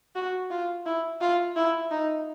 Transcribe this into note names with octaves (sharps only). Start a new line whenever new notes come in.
F#4
F4
E4
F4
E4
D#4